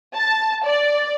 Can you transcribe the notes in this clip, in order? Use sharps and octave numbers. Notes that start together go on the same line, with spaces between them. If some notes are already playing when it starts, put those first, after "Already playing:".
A5
D5